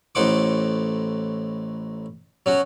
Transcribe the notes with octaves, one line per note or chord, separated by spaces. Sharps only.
A1 A2 D#4 C5 F#5 D6
F#3 C#4 F#4